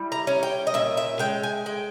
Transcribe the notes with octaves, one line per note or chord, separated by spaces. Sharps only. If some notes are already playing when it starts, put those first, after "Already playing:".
Already playing: G3 E4
A#5
C#4
G5
D#5
A#2 E5
E5
G#3 G5
G#5
G#3 G5